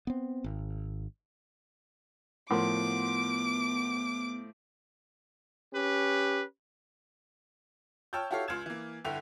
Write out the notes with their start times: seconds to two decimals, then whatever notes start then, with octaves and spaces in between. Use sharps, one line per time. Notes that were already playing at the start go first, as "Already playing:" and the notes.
0.07 B3 C4
0.44 G#1
2.50 A2 F3 B3 A#4 F#5 C6 D6
5.74 C#4 G4 B4
8.13 C#5 G5 A5 E6 F6 G6
8.31 E4 F#4 G4 A4 C#5 F5
8.48 C#2 F4 F6 G#6 E7
8.66 E3 A#3
9.05 G1 D3 E4 G5 F7